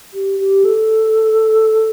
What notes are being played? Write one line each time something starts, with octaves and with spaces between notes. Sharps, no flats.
G4
G4
A4